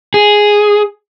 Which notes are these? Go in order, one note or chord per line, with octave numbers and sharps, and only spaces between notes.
G#4